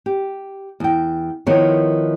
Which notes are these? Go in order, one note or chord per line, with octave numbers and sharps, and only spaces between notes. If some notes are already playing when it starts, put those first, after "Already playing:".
G4
E2 G5
D#3 F3 B3 E4 A#4 C#5